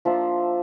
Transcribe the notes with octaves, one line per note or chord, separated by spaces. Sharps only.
F3 A#3 D4 F4 E5